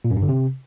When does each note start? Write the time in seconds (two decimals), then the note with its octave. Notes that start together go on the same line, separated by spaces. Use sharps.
0.05 A#2
0.10 F#2
0.16 G2
0.22 D3
0.28 C3